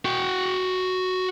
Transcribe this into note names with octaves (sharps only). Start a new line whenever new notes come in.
F#4 G5